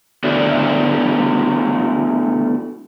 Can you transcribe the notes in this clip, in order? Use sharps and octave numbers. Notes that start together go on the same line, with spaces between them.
A3 B3 D4 E4 F#4 D5